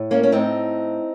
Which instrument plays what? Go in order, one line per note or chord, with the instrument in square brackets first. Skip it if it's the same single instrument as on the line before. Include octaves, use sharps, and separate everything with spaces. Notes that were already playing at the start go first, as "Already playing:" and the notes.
Already playing: [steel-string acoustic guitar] A2
A#3 C#4
C#4
A2 C4 D#4